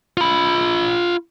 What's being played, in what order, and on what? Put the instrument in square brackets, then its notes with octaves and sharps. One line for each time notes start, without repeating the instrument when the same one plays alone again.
[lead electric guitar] F4 B5